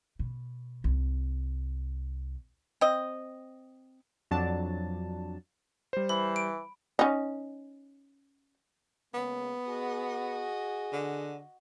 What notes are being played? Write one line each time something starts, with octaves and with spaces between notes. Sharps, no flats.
B2
C2
C4 D#5
F2 F#3 D4 A5
G3 C5
E3 B5
D7
C#4 D#4
C#3 G#3 A#3 B3
F#4 G#4 D#5
D3